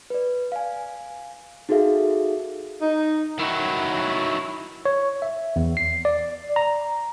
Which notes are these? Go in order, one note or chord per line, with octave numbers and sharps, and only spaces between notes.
B4 D5
F5 G#5
D#4 F#4 G#4 A4 E5 F5
D#4
D#3 F#3 E4
C#5
E5
E2
C7
D5
A#5